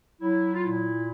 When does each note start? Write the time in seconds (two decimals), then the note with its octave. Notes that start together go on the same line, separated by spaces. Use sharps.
0.21 F#3 E4
0.54 F4
0.62 A#2 E4